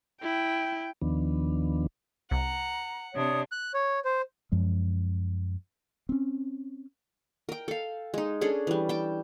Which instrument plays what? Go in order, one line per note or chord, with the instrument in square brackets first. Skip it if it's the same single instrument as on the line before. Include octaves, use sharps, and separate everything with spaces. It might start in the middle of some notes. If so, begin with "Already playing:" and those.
[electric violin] E4 [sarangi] G5
[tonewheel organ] D#2 D#3 F3 B3 D4
[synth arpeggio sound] C2 [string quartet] F#5 [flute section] A#5
[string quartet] C3 D4 [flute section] C#5 D5 D#6
[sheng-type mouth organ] F#6
C#5
C5
[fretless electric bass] F#2 F3 G#3
C4 C#4
[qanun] A#4 G5
A4 F5
G#3 D#4
C#4 D4 G#4 A4
E3 G3
G5 A5